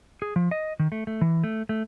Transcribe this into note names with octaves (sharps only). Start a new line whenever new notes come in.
G#4
F3
D#5
D#3
A3
A3
E3
A3
A3